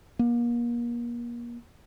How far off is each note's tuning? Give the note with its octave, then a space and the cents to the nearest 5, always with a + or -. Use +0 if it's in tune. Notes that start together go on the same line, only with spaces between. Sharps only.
A#3 +35